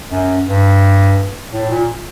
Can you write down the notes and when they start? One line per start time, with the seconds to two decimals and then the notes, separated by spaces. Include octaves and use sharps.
0.10 F#2
0.46 G2
1.53 A2
1.70 A#2